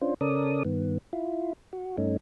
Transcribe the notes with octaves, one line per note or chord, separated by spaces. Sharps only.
C#4 D4 F4 C5
C#3 C#4 A4 A#4 D5 D#6
G2 D#3 B3
E4 F4
F#4
G2 A3 C#4 D#4